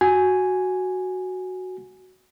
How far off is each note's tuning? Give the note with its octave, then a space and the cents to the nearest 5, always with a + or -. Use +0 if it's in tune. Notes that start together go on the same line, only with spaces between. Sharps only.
F#4 +0 G#5 +0